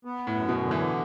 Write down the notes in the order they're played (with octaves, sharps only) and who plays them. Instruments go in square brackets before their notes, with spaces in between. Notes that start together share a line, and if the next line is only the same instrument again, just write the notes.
[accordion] B3
[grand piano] A2
[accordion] F#2
[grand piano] B2
[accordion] D3
[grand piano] E3